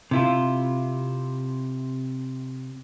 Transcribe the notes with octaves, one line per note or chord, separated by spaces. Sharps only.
C3 E4 F4